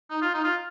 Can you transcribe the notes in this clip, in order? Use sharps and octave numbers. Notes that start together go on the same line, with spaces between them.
D#4
F4
D#4
F4